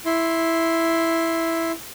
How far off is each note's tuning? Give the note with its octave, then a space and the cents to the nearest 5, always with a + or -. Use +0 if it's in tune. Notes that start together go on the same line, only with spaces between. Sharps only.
E4 +0 C6 +0